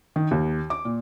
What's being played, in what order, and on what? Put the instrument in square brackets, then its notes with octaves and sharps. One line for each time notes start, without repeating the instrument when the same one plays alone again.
[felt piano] D#3
D#2
D6
A#2